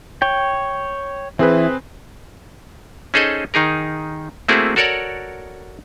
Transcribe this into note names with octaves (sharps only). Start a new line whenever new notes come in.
C#5 G5
E3 C4 G#4 B4
C#4 D#4 G#4 A4 C5 D#5
D#3 D#4 G#4 A#4
A3 A#3 C4 E4 F#4 G#4
F#4 A4 A#4 C#5 D5 F#5